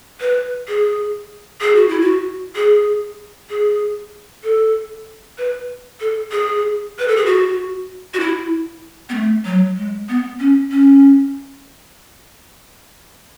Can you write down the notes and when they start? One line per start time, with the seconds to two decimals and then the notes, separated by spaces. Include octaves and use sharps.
0.21 B4
0.68 G#4
1.61 G#4
1.75 F#4
1.88 E4
2.00 F#4
2.56 G#4
3.50 G#4
4.44 A4
5.38 B4
6.00 A4
6.32 G#4
6.99 B4
7.08 A4
7.17 G#4
7.26 F#4
8.14 F#4
8.20 E4
9.09 B3
9.15 A3
9.45 F#3
9.77 G#3
10.09 B3
10.40 C#4
10.71 C#4